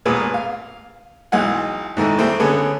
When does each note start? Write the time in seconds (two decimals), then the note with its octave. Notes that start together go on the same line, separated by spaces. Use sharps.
0.05 G#1 D#2 A#2 B3 G#4
0.34 F5
1.32 B1 E3 G#3 D#4 F#5 G#5
1.97 G#2 D#3 E3 A3
2.19 D#3 G3 A3 C4
2.40 D3 B3 C#4 G#4